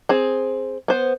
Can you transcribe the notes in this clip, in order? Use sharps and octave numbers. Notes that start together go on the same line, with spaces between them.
C4 G#4
B3 C5